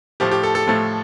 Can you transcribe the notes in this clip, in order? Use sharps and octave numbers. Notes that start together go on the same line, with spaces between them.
A2 F3 A3 G4
G4
A4
A4
A2 F3 A3